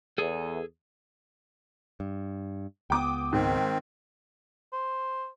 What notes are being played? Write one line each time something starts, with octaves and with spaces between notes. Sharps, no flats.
E2 G#4 A4
G2
C#2 B3 G5 D6 D#6
G#2 D#3 C4
C5